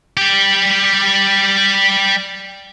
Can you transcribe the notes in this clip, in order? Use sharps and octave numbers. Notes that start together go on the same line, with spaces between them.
G3 G4